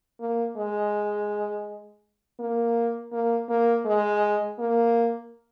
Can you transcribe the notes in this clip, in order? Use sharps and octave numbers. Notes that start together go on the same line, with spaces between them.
A#3
G#3
A#3
A#3
A#3
G#3
A#3